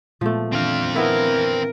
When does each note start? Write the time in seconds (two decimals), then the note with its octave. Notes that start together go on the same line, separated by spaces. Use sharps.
0.21 A#2 F3 G#3 A3 B3
0.53 D#3 E3 C4 D4 F5
0.96 B3 E4 A#4